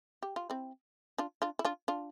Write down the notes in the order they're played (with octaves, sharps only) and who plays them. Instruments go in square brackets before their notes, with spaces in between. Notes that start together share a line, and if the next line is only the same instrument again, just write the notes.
[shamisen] G4
F4
C4 E4
D4 F4
D4 F4
E4
D4 F4
D4 F4